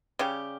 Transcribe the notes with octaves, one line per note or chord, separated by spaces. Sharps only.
C#3 G3 C#4 G4